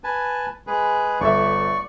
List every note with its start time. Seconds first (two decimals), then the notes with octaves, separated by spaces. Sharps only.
0.04 B4 G#5 A5
0.67 G#3 G#4 B4
1.21 G1 A4 D5 E5 C#6